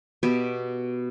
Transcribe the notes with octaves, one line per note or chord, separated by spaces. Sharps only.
B2 B3 G4 E5